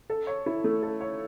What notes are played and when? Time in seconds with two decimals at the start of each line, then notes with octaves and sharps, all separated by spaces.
0.10 A4
0.27 C#5
0.46 E4
0.64 A3
0.83 A4
1.01 C#5